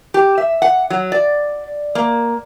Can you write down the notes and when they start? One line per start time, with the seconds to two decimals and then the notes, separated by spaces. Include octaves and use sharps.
0.14 G4
0.38 E5
0.62 F#5
0.90 F#3
1.12 D5
1.95 A#3